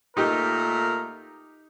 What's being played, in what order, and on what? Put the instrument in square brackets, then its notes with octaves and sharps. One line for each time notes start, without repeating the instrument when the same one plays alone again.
[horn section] A#2 A3 A#4 [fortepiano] D#4 G4